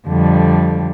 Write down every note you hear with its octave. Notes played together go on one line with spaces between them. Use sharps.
F2 D3 G3